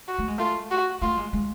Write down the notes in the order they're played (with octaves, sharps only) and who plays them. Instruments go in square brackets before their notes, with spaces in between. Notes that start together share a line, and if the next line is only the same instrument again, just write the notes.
[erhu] F#4
[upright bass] A3
G#3
[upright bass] A3 [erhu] F4
[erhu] F#4
[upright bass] A3 [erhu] F4
[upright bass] G#3
G#3